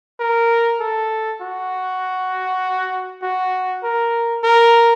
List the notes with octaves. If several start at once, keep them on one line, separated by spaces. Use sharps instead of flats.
A#4
A4
F#4
F#4
A#4
A#4